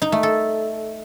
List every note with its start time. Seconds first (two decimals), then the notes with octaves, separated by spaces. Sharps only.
0.02 D#4
0.12 A3
0.23 A4